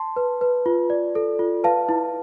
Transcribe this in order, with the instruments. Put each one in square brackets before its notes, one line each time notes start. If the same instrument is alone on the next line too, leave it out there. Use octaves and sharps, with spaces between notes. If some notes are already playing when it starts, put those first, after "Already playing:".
Already playing: [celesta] A5 C6
B4
B4
F4
D5
A4
F4
B4 F5 A5
E4